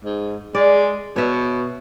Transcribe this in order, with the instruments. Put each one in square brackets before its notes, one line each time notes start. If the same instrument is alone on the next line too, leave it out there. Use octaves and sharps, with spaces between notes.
[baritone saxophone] G#2
[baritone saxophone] G#3 [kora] D5
[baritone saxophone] B2 [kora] C#5 E5